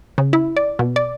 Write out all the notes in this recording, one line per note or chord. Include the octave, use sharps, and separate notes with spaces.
C#3
E4
D5
B2
D5